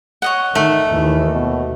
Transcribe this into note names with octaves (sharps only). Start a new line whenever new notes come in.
C#5 D#5 F#5
D#3 A3
D#2 E3
B2